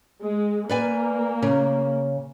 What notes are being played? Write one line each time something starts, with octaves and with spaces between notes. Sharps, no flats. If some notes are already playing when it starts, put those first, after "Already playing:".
G#3
A#3 B4 D5 G#5
C#3